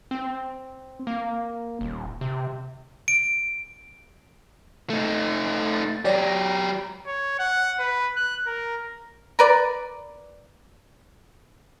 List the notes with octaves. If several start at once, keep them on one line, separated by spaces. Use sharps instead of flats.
C4
A#3
D#1
C3
D7
A3 D#4
A6
F#3 G4 C#5 D5 A#6
A#5
C#5
F#5
B4
F#6
A#4
A#4 B4 D5